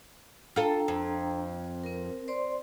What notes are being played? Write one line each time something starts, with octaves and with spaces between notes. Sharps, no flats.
D4 F4 A4 G5 A#5
F2
C4 A#4
C5 D5 C6